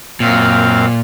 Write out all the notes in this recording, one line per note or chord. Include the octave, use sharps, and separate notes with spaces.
F#2 A#2 C4 F5